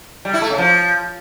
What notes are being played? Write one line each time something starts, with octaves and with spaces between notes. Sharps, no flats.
G3
E4
A3
C#3
F3